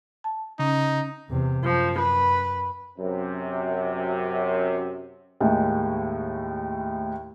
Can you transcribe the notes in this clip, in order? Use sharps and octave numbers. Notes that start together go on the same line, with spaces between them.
A5
C#3 C#4 D#4
E2 C3
F#2 F3
B4
F#2 C3
D#2 A2 G#3